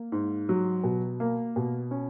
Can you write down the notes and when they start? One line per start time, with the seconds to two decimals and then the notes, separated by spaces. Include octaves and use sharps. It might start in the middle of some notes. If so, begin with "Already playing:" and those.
Already playing: A#3
0.12 G#2
0.49 F#3
0.84 B2
1.20 A#3
1.56 B2
1.91 C#4